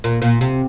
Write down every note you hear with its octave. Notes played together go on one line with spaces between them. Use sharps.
A#2
A#2
C3